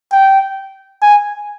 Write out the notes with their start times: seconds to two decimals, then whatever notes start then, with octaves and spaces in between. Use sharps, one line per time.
0.12 G5
1.02 G#5